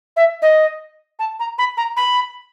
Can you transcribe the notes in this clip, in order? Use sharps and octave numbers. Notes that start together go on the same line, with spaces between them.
E5
D#5
A5
A#5
B5
A#5
B5